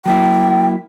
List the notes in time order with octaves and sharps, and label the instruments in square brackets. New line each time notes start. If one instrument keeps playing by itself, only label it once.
[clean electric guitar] F#3 A#3 E4 [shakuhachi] G5